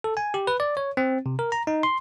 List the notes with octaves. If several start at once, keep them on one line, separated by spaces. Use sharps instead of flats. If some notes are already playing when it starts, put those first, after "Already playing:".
A4
G#5
G4
B4
D5
C#5
C4
C3
A#4
A#5
D#4
C6